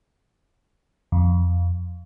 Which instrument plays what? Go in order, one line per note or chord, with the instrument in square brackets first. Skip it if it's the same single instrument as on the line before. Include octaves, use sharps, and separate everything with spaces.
[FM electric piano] F2